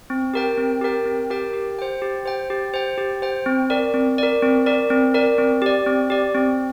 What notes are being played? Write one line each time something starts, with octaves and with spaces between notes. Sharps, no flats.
C4
G4 A#4 G5
C4
G4 A#4 G5
C4
G4 A#4 G5
G4
C5 G5
G4
C5 G5
G4
C5 G5
G4
C5 G5
C4
A#4 D5
C4
A#4 D5
C4
A#4 D5
C4
A#4 D5
C4
G4 D5
C4
G4 D5
C4